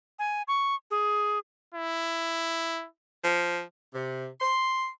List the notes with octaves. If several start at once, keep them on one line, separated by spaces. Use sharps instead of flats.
G#5
C#6
G#4
E4
F3
C3
C6